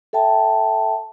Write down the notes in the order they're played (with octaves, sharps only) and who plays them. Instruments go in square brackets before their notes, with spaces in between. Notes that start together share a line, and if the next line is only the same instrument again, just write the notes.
[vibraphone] A4 E5 G5 A5